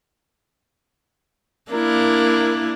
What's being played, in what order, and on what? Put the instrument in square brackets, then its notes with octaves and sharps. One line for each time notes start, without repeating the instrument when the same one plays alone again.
[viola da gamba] A#3 D4 E4 [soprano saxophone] A#4